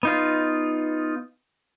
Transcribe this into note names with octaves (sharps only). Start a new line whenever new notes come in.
B3 D#4 F4